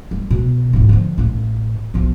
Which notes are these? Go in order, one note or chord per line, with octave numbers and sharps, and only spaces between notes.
G3
B2
G#1 E4
D3 F3
A1 A2
B1 F3